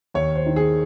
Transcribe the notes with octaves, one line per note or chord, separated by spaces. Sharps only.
D#2 C#5
C5
D#3
G#4